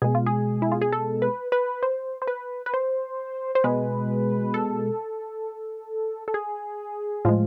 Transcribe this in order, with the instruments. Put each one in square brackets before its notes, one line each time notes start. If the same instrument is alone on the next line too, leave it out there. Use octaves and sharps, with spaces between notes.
[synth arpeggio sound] B2 G#3 G#4
F4
G#4
E4
F4
G#4
A4
B4
B4
C5
C5
B4
B4
C5
C5
B2 G#3 B4
A4
A4
G#4
A2 F3 G#3 F4